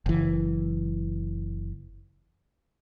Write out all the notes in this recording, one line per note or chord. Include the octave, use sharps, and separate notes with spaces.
F#1 E3